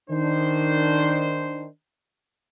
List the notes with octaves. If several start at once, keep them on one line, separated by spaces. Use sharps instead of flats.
D#3 D4 C5